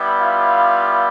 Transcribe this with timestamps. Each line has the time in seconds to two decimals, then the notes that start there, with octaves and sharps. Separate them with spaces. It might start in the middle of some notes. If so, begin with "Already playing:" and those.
Already playing: G3 B3 E4
0.20 F4 F5